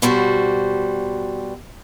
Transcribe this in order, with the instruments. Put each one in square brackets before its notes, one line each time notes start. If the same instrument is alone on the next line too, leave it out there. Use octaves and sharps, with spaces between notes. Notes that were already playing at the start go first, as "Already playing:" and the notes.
[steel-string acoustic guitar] B2 G3 F#4 C5